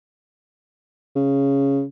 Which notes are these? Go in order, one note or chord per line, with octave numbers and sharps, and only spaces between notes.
C#3